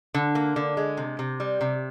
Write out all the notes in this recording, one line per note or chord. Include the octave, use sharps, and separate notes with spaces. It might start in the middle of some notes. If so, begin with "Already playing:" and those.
D3
A#3
D3
G#3
C3
C3
G3
C3